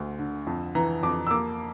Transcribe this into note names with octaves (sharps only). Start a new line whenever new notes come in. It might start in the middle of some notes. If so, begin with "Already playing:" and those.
Already playing: D2 D3
D3
F2
E3 A#5
F2 D6
E6
A#3 D6